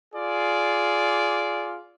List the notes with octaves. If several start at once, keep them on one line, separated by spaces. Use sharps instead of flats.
F4 G#4 D5